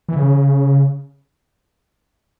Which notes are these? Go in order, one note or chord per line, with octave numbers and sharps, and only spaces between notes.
E3
C#3